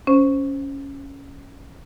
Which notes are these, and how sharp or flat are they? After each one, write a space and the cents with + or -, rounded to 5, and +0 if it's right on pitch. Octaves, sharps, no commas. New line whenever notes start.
C#4 +0 C5 +0